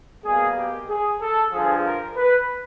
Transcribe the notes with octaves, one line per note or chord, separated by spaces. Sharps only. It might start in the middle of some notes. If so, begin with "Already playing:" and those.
B2 G3 A#3 G#4
G4
G#4
A4
G2 D3 F3 G#4
A#4
B4